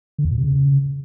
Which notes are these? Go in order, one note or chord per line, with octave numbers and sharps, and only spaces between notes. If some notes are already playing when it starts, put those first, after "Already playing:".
D3
E2
A#2
C3
C#3